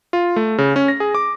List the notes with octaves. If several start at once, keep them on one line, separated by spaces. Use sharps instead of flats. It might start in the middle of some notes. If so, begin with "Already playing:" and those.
F4
A3
C#3
C#4
A#6
G#4
D6